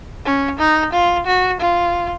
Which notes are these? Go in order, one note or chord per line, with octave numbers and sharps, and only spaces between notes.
C#4
D#4
F4
F#4
F4